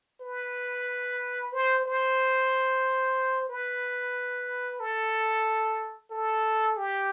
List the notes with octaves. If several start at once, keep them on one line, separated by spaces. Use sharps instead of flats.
B4
C5
C5
B4
A4
A4
G4